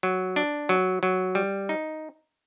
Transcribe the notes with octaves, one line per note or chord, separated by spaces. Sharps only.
F#3
D4
F#3
F#3
G3
D#4